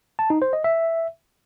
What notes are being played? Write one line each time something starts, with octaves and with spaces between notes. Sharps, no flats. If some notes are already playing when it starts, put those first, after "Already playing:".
A5
D#4
C5
D#5
E5